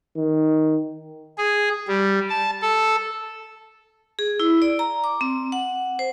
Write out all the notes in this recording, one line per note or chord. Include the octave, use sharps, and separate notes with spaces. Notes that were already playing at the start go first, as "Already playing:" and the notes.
D#3
G#4
G3
A5
A4
G#4
E4
D5
A#5
D6
C4
F#5
C5